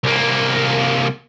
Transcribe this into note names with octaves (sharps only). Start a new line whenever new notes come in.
C2 A#3